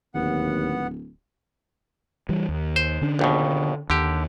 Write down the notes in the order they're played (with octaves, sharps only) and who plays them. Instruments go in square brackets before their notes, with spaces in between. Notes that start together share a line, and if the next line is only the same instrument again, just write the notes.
[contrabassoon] D1 [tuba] D#2 [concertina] B3 F#5
[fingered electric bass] E3 G3
D#2
[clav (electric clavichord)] C5
[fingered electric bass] D3 C#4 D4
[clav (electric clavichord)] A#1 D#2 B2
[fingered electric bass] D#2 [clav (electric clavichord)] D3 G4